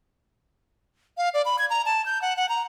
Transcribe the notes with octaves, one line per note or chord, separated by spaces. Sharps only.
F5
D5
B5
G#6
A#5
A5
G6
F#5
F#5
A#5